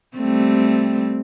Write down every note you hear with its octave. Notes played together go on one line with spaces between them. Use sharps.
G3 A3 C4